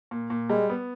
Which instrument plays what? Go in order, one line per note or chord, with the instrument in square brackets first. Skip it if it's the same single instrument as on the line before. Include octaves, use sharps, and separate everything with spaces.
[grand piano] A#2
A#2
[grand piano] G3 [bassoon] G#3
[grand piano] B3